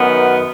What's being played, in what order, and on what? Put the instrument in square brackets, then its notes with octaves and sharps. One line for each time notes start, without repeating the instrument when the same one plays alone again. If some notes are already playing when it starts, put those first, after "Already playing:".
Already playing: [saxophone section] F#2 D#3 B3